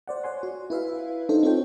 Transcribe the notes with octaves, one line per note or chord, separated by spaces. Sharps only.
C5 D5 F#5
C5 C#5 F#5 G#5 C6
F#4
E4 B4 E5 F5
D4 D#4 A4 C5
C4 F4 A4 C5 C#5 G5